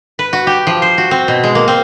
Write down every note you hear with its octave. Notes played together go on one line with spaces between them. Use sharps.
B4
F#4
G4
F3
C5
F#4
C4
B2
G#3
A#3
C4